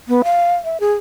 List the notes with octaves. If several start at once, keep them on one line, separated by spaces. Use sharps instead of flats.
B3
F5
E5
G#4